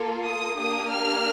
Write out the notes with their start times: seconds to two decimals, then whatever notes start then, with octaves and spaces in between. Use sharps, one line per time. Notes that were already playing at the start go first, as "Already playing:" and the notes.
Already playing: A#3 F4 A4
0.25 D#6
0.58 A#3 D4 G4 D#6
0.90 F6